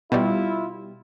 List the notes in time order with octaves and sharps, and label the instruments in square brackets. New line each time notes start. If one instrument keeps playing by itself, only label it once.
[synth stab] B2 G3 [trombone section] E4 F4